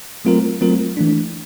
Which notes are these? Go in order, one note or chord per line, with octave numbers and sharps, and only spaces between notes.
F#3 A3 C4 F4 A#4
F#3 A3 C4 F4 A#4
E3 A3 D4